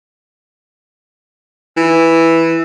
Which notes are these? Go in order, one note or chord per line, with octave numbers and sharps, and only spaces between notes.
E3